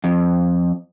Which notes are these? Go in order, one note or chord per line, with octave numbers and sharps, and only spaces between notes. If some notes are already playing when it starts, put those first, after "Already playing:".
F2